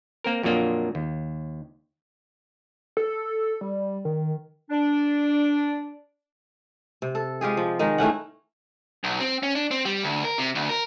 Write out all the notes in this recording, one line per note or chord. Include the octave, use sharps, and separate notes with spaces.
A#3 C4 A#4
F2 A#2 F#3 A#3 D4 D#5
D#2
A4
G3
D#3
D4
C3
A4
G#3 F4 G4 G#4
F3
D#3 G#3 D#4
E3 A3 C#4 F#5
B1
C4
C#4
D4
C4
G3
D2
A#4
C3
D2
A#4